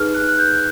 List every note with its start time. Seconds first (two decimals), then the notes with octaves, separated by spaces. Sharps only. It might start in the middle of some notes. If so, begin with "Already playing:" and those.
Already playing: D#4 G#4 B4 F6
0.15 F#6
0.29 F#6
0.39 G6